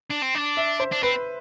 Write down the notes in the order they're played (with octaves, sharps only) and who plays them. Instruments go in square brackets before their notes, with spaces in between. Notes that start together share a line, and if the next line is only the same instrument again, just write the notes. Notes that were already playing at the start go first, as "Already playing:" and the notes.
[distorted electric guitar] D4
C4
D4
[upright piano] E5
C5
[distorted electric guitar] D4
[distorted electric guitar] C4 [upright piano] B4